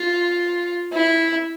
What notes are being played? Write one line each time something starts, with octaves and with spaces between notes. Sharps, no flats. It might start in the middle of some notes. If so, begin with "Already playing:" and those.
Already playing: F4
E4